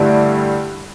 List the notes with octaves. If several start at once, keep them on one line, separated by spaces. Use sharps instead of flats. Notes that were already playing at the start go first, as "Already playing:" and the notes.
Already playing: G2 D3 A3 E4 G4